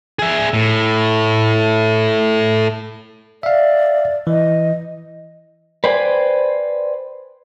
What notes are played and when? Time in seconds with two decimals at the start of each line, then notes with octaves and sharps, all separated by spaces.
0.19 G#4 E5
0.54 A2
3.43 D5 E5 F5
4.27 E3 D#5
5.84 B4 C5 D5 G5 G#5